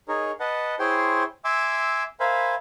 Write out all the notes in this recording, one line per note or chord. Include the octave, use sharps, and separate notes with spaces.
D#4 G#4 A#4 C#5
B4 D#5 F#5 A5
E4 G#4 C5 C#5 G5 C6
E5 G#5 C6 D6 E6
A#4 C5 E5 F5 G#5 B5